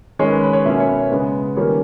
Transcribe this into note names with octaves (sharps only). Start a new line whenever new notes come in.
D#3 G#3 C#4 C#5
B4
B4
C#5
B2 A#3 C#4 E5
C#5
B4
C#3 G#3 B3
D#3 G3 A#3 C#4 C#5